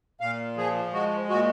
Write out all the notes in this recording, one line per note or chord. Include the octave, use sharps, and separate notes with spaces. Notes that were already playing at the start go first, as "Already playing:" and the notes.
A#2 F5
F3 G#4
G#3 F#4
A#2 F#4